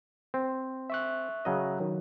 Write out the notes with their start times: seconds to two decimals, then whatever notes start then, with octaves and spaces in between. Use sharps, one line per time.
0.34 C4
0.90 E5 C#6 F#6
1.45 C#3 F#3 D#5
1.80 D#3 F#3